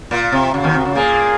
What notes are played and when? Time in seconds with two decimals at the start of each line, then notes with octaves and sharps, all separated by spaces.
0.11 A#2 F4
0.32 C3
0.53 C#3 F#4
0.64 D#2 D#3
0.74 C3
0.85 C#3
0.95 A#2 A#3 G#4